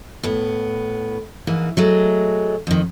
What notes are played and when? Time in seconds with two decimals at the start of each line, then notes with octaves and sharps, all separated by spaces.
0.23 A2 B3
1.47 G#2 E3 A#3
1.77 F#3 G#3 A3
2.67 F2 D#3